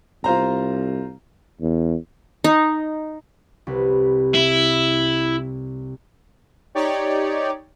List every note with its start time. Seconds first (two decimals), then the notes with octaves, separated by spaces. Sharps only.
0.24 C2 F4 C5 A#5
1.61 E2
2.44 D#4
3.67 C2 B4
4.35 E4
6.75 D#4 G4 C#5 D5